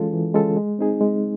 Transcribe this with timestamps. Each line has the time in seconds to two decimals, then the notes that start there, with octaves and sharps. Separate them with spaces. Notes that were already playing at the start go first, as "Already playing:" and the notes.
Already playing: E3 G#3 C#4 F4 A4
0.13 E3
0.34 G#3 C#4 F4 A4
0.56 G#3
0.79 C4 D#4 G#4
1.01 G#3